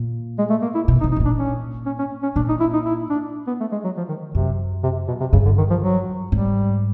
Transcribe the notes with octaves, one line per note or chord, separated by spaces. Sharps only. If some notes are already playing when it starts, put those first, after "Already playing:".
Already playing: A#2
G#3
A3
A#3
E4
B2
D#4
C3
D#4
A2
A#2
D4
C#4
C#4
C#4
C#4
A#2 D4
D#4
E4
D#4
E4
D4
B3
A3
G#3
F#3
F3
D#3
F#2 C3
C3
B2
C3
G2 C#3
D3
D#3
F3
F#3
G#2 G3